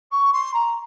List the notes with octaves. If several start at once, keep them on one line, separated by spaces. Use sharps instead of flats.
C#6
C6
A#5